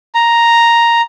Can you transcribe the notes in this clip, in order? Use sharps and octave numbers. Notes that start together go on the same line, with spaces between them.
A#5